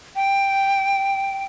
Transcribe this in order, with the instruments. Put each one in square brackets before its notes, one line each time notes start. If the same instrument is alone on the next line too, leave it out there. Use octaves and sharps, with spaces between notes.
[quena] G5